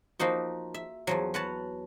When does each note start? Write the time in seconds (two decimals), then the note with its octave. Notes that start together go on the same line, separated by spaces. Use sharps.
0.19 F3 A#3 D#4 F#4
0.74 E5
1.07 E2 F3 F#3
1.34 F#4 B4 C#5 A5